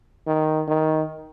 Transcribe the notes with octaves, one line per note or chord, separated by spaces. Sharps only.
D#3
D#3